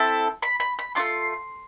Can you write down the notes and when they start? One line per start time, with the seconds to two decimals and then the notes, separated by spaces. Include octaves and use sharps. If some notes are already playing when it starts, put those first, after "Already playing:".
Already playing: C4 E4 A4
0.42 B5
0.60 B5
0.79 B5
0.95 A3 D4 F4 C6